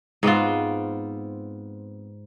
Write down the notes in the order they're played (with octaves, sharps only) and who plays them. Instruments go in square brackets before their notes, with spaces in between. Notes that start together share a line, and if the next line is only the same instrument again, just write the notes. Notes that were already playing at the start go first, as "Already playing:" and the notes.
[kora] G#2 B3 C4 F4